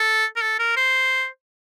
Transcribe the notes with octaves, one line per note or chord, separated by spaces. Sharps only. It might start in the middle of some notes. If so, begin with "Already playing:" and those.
Already playing: A4
A#4
A4
A#4
C5